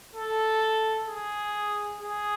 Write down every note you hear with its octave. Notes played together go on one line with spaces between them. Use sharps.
A4
G#4
G#4